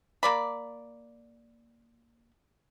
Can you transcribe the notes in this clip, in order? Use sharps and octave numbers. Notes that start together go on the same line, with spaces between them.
A#3 D5 B5